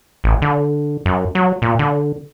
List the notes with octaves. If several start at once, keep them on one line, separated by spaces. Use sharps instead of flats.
A1
D3
F#2
F#3
A#2
D3